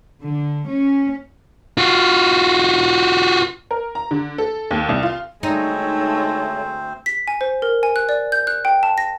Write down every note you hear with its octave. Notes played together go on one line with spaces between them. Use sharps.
D3
C#4
F4 F#4
A#4
A#5
D3
A4
D#2
C2
F4
D2 G#3 A3 C4 D#4 C5 C#5
B6
G#5
C5
A#4
G#5
F#6
D5
G6
F#6
G5
A5
A#6